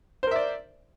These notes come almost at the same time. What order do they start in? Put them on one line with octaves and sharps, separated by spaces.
C5 A#4 E5 D5